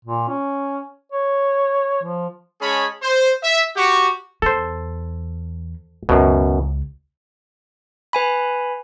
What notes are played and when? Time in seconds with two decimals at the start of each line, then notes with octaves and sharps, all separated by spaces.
0.05 A#2
0.28 C#4
1.12 C#5
2.03 F3
2.61 G#3 C#4 G#4 C#5 A5 B5
3.02 C5
3.44 E5
3.77 F#4 G4 C#6
4.42 E2 A4 C5
6.09 C#2 F#2 B2
8.13 B4 G#5 B5